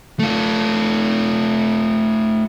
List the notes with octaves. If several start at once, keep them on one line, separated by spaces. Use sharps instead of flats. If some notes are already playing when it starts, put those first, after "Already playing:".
A3 F4